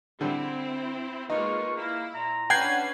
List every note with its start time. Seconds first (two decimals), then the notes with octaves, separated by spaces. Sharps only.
0.21 D3 G3 C4 E4
1.30 G#3 A#3 D#4 F4 B4 C#6
1.76 A#3 E4
2.15 A#2 A#5
2.50 C#4 D4 B4 F#5 G5 G#6 C7